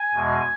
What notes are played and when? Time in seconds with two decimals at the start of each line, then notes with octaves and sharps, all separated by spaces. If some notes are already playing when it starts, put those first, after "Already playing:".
Already playing: G#5
0.14 E2 B2 G#3